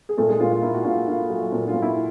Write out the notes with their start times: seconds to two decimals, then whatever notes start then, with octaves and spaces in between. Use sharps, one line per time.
0.09 G#4
0.17 A#2 A3 A4
0.29 G#3 G#4
0.40 A#2 F4
0.52 F4
0.62 A#3 E4
0.75 F#4
0.85 A#2 F4
1.08 A#3 F4
1.30 F#3 F4
1.52 A#2
1.68 F4
1.74 A#2
1.82 E4